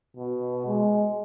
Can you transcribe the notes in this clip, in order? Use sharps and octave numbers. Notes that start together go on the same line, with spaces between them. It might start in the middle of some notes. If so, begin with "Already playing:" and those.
B2
G#3